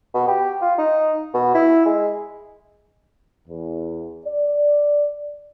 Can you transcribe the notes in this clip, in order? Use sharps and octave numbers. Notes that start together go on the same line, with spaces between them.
B2
G4
F4
D#4
B2
E4
G#3
E2
D5